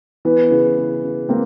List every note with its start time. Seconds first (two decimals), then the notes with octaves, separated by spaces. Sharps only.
0.25 E3 B3
0.51 C#3
0.77 C#3
1.04 C#3
1.29 C#3 A#3 C4